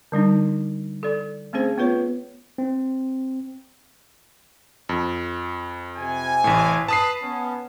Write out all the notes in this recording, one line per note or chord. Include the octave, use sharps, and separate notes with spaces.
D3 G3 D4 D#4
A4 D5
A3 C4 C#4 G#4 C5
B3 F4 B4 C#5
C4
F2
C3 G#5
A1 A2
B4 A5 D#6 C7
B3 C#4